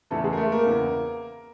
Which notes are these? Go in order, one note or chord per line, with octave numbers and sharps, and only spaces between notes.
E2 C#3 E3 A3 A4
G#3 G#4
A#4
A3 A4
A#3 A#4
E2 C#3 E3